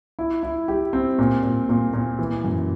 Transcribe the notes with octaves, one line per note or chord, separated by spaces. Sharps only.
E4
E4
G4
C4
A#2
A#2
A#2
A#2
E3
F#2